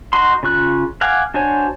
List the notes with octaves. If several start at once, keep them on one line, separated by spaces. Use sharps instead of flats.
D#4 F#4 C6
C#3 F4 C#6 F#6
F5 F#5 G#5 D6
D4 F#4 C5 C#5 G#5